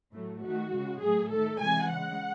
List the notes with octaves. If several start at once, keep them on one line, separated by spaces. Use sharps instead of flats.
A2 F#3 A3
D#3 A3 F#4
C#3 G#3
A2 F#3 A3 G#4
D#3 A3 A4
C3 E3 G#3 G#5
C#3 G#3 F#5